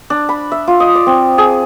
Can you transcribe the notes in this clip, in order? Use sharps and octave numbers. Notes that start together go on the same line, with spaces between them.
D4
B5
E5
F4
D#5
D5
C4
G#4